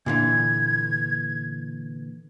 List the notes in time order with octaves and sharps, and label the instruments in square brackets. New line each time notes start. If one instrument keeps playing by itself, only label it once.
[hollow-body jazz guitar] A#2 D3 E3 [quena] G#6